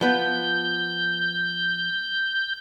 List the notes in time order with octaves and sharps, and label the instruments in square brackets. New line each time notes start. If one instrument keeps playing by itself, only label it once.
[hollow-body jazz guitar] F3 B3 F4 [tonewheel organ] G6